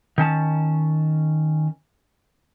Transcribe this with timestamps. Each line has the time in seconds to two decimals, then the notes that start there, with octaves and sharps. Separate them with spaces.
0.18 D#3 C#4 A5